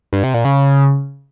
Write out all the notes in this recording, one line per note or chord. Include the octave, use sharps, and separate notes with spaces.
G2
C3
A#2
C#3